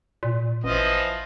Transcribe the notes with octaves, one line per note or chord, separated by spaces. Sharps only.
A#2
A1 E3 F3 D#5